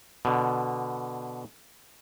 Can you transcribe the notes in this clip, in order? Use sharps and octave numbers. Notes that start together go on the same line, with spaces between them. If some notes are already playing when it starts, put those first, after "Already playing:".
B2 D3